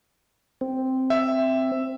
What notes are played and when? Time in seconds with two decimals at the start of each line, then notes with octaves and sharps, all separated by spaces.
0.61 C4
1.10 E5